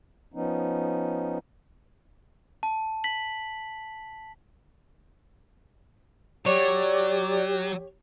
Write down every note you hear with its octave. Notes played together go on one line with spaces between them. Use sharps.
F3 B3 C#4 D#4
A5
B6 F#7
F#3 G4 C#5 D5